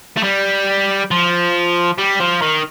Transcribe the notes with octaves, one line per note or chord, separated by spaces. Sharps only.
A3
G3
F3
G3
F3
D#3